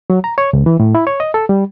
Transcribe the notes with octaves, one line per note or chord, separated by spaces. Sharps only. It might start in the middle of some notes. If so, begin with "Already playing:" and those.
F#3
A#5
C#5
C#2
E3
A2
E4
C#5
D#5
A4
G3